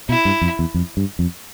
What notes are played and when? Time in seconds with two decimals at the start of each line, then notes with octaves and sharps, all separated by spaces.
0.09 B2 E4
0.25 G2
0.41 F2
0.59 E2
0.74 F2
0.97 G2
1.19 F2